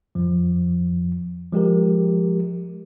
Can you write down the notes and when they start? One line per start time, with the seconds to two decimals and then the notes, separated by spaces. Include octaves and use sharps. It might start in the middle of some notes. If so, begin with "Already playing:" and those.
0.15 F2 F3
1.52 F3 G#3 G4 A#4